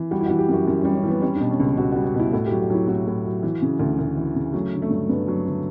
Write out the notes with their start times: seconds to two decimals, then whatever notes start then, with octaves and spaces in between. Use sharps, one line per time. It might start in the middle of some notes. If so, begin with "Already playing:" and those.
Already playing: E3
0.11 G3 F#4
0.21 E4
0.26 E3 F#4
0.39 G4
0.49 F#2 F#4
0.67 F#2 E4
0.81 G3 C#4
0.95 C#4
1.03 E3 B3
1.22 G3 C#4
1.36 B2 D4
1.50 C#4
1.60 C#2
1.77 C#2 F#4
1.92 G3 F#4
2.05 F#4
2.15 B2 E4
2.33 A2 F#4
2.46 G4
2.51 F#3
2.61 F#4
2.70 F#3 E4
2.88 A2 F#4
3.07 A2
3.25 F#3
3.43 E3
3.62 C#3
3.80 D2
3.99 D2
4.17 E3
4.36 C#3
4.53 F#3 A3
4.72 D3
4.82 A3
4.90 G2
5.09 G2 B3
5.28 F#3
5.46 D3